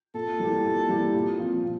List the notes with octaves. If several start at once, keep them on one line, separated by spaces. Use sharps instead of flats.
A#2 A4
G3 A#3 E4 G4
A#2
G3 A#3 E4 G4
A#2
F3 C4 F4
A#2